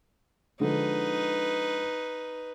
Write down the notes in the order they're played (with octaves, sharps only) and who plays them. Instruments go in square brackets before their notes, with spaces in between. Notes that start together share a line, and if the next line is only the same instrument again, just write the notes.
[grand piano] D3 F3 G#3 [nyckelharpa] D#4 B4